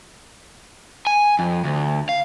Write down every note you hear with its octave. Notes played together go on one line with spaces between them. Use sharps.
G#5
F2
D2
F5